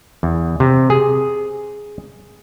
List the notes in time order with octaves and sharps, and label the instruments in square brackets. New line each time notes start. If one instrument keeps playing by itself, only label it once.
[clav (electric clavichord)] E2
C3
G#4